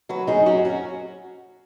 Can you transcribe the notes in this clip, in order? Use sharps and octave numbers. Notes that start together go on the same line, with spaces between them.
F#3 F#4 B4
F#2 D#4 G#4
F#3 C#4 F#4
C#4 F#4